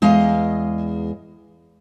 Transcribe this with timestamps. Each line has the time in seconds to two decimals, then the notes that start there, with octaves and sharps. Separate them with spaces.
0.02 E2 G#3 D#5 F5